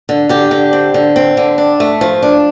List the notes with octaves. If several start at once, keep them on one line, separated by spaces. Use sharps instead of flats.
D3
D3 G4
D3
C4
D3
C4
D3
D4
A3
F3
D4